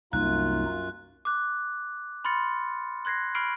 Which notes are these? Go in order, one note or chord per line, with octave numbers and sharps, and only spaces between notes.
C2 F#2 A#3 D#4 F4 F#6
D6 F#6
B5 C6 F6 A6 C#7
C6 F#6 G#6 A#6 C7
B5 C#6 F6 C7 D7 F#7